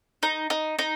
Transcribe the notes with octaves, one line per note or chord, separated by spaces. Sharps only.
D#4
D#4
D#4